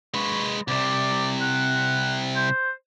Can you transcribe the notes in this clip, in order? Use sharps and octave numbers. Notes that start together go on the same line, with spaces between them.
G#3 B4 C#6
C2 C3 D5
F#5
C5